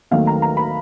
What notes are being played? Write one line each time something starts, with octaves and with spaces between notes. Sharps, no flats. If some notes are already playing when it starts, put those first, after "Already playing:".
D#2 D#3 F#3 A3 C4 F5
A#5
A#5
B5